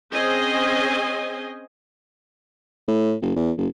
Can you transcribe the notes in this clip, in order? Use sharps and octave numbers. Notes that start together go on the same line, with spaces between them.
C4 C#4 G#4 C5 D#5 G#5
A2
F#1
E2
F#1